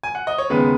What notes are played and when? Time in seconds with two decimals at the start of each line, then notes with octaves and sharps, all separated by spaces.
0.03 G#5
0.15 F#5
0.27 D#5
0.38 C#5
0.50 D#2 C#3 G#3 B3 B4